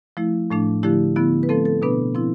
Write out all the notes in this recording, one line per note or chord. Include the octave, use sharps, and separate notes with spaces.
F3 A3 E4
A2 F3 A3 D4
D3 F3 A3 E4 G4
D3 F3 B3 E4
B4
F3 A3 C4 A4
A4
B2 B3 D4 B4
F3 C4 E4